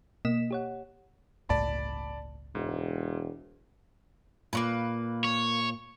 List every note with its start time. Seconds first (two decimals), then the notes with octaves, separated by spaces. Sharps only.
0.25 B2 A#3 D#5 B6 E7
0.51 G4 C#5 F#5
1.49 G1 C#2 A2 D5 A5 B5
2.55 E1 G#2
4.53 A#2 A#3 C#4 B4
5.24 C#5